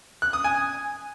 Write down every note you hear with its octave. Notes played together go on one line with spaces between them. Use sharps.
F#6
D#6
G#5